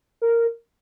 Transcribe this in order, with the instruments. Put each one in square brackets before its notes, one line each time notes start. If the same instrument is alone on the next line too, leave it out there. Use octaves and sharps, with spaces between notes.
[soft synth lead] A#4